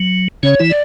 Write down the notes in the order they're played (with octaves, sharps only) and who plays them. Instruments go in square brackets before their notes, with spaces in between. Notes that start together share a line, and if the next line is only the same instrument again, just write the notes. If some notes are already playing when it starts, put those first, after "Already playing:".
Already playing: [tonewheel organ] F#3
[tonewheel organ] C#3 C#4 [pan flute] C#5
[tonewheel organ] E3 E4
[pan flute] D5